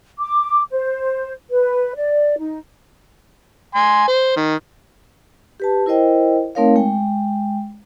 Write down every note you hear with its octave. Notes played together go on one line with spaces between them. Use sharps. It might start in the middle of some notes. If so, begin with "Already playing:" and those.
D6
C5
B4
D5
D#4
G#5 C6
C5
D#3
G4 B4 A5
E4 A#4 C5 D#5 G5
A3 C4 D#4 A#4 C#5 F5
G#3 G5